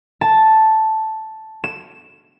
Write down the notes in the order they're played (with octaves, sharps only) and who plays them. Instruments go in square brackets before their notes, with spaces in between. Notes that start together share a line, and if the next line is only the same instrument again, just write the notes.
[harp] A5
E7